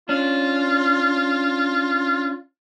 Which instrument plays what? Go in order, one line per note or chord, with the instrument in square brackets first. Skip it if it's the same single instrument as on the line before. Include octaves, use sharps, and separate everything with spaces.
[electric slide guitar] C#4 D4 [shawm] F4